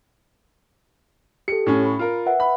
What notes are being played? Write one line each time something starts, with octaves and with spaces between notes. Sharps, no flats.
G4 A4 C#7
A2 C#4
B5
F4 A#4
B4 E5 F#5
B5